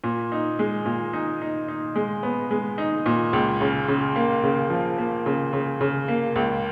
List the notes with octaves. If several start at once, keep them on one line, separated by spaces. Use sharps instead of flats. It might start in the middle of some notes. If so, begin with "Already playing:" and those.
A#2
D#4
G#3
A#2
D#4
D#4
D#4
G#3
B3
G#3
D#4
A#2
C#2
C#3
C#3
A#3
C#3
F3
A#3
C#3
C#3
C#3
A#3
C#2